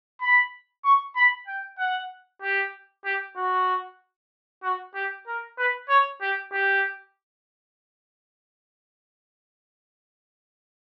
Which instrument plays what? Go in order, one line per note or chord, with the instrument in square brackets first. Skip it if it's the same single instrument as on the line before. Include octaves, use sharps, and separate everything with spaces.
[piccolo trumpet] B5
C#6
B5
G5
F#5
G4
G4
F#4
F#4
G4
A#4
B4
C#5
G4
G4